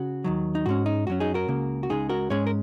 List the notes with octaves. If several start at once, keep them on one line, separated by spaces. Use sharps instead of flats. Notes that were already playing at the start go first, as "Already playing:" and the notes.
Already playing: C#3 F#4
D#2 D#3 F#3
D#4
G#2 G#3 C#4 F#4
D#4
F#2 F#3 C#4 F#4
D#4 G#4
F#4 A#4
C#2 C#3 A#3
F#4
C#2 C#3 G#3 D#4 G#4
F#4 A#4
G#2 G#3 C#4 G#4 C#5
A#4